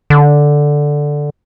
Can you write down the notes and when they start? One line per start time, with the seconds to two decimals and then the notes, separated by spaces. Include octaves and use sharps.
0.10 D3